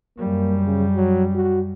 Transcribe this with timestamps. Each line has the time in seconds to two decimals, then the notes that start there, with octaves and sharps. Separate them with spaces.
0.18 F#2 G3 A#3
0.65 C#3
0.96 F#3
1.35 F#4